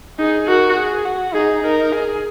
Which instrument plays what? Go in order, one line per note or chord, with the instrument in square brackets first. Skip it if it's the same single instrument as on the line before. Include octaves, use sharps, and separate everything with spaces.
[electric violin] D#4 [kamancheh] G#4
[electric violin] F#4 [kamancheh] A#4
[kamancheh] G#4
F#4
[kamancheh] D#4 [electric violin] G#4
[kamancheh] D#4 [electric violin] A#4
[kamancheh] G#4